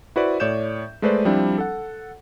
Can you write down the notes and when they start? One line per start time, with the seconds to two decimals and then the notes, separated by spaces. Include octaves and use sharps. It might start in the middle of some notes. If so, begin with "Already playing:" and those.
0.16 E4 F#4 B4 C5 D5
0.40 A2 C#5 D5 G6 E7
1.02 G#3 A3 B4 C5 D5
1.25 F3 G3 C4 D4 E4
1.58 A4 F#5